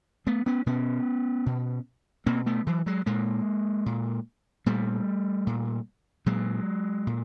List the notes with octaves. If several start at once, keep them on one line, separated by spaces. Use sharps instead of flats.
A3 B3
B3 C#4
B2 B3 C#4
B2
B2 A#3 C4
A3 B3
E3 F#3
F#3 G#3
A#2 G#3 A#3
A#2
A#2 G3 A3
A#2
A#2 F#3 G#3
A#2